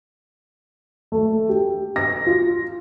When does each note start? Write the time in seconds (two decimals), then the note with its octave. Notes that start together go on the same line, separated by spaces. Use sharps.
1.12 A3
1.49 G4
1.96 A#6
2.27 F4